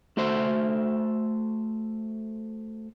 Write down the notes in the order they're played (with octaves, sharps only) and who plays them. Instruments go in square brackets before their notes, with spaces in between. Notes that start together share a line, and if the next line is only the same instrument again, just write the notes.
[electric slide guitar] A3 F#4 A4 C5 E5